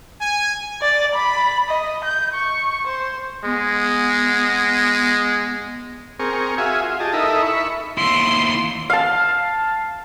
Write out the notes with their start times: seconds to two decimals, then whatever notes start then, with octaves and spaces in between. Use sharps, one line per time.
0.19 G#5
0.82 D5
1.15 B5
1.68 D#5
2.04 G6
2.34 C#6
2.87 C5
3.44 G#3 B3
6.20 C4 G#4 A#4 C#6
6.58 F#4 G#4 E5 F5 G#5
6.82 F4
7.00 G4 G#4 D#5 A5
7.13 D#4 E4 A4 A#4 D#5 E5
7.42 E5 B5 C#6
7.98 D#2 E4 C6
8.90 F5 A5